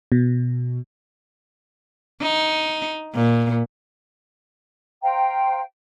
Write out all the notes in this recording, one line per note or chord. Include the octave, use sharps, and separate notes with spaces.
B2
D#4
A#2
C5 F5 G5 A#5